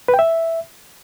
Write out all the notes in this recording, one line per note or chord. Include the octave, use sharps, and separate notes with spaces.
B4
G5
E5